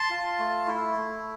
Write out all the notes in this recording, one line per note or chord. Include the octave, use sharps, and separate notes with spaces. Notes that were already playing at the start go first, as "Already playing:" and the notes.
Already playing: A5 C6
F4
A3
E4
A3